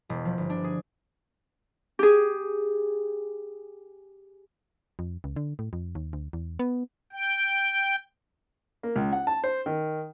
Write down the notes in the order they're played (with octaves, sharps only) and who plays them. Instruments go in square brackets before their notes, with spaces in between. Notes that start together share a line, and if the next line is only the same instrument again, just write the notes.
[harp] E1
F3
G1
D4
G#4
G4 G#4
[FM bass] F2
C#2
D3
A2
F2
D#2
D2
E2
B3
[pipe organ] G5
[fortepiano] A#3
C#2
F#5
A5
C5
D#3